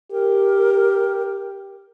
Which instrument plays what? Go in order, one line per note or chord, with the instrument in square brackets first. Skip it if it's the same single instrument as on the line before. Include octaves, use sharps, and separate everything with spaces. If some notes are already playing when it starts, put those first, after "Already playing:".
[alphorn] G4 [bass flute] A#4